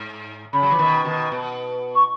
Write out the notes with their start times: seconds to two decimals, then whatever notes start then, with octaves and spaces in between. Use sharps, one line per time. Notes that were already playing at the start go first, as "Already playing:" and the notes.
Already playing: G#2
0.53 C#3 B5
0.63 F#3
0.71 E3
0.79 B2 D#3
1.05 B2 D#3
1.32 B2
1.95 C#6